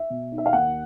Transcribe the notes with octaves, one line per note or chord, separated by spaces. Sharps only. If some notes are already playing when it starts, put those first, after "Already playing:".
Already playing: E5
B2
D#4
E5
F5
D#2 F#5